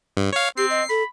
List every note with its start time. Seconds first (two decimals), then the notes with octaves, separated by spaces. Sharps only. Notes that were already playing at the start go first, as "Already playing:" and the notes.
0.17 G2
0.33 C#5 F5
0.58 C4 G4 C7
0.70 D#5
0.89 A4 B5